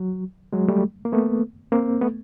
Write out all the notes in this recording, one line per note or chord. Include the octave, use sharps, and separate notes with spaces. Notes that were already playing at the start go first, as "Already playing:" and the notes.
Already playing: F#3
F#3 G#3
G3 A3
A#3
A3 B3
A#3 C4
A3 B3